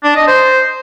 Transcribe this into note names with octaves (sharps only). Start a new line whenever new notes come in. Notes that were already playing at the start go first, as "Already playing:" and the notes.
D4
D#5
C5